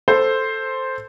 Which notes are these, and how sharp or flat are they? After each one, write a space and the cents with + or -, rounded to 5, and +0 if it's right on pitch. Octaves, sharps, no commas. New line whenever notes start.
A4 +0 C5 +0